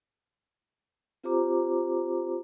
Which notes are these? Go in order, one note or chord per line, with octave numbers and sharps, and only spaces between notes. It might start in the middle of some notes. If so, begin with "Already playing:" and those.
C4 F4 G4 C5 A#5 D6